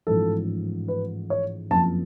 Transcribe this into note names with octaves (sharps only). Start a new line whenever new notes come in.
A1 G#2 F3 A4
B4
C#5
F#1 F2 F3 A5